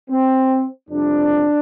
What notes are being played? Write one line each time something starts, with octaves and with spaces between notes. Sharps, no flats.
C4
F2 C3 G3 D4